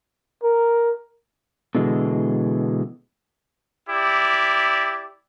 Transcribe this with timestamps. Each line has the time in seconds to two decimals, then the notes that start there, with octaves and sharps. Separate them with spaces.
0.44 A#4
1.75 B2 D3 E3 G#3
3.90 E4 G4 D5